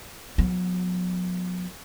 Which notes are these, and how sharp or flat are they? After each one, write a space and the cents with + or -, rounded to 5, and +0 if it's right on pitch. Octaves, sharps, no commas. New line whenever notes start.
F#3 -40 B3 +0